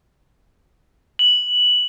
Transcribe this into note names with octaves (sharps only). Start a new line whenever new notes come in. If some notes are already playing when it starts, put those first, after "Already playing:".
F#7